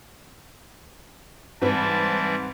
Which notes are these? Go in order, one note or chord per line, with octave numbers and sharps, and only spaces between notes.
G#2 E3 G3 C4 B4 E5 A5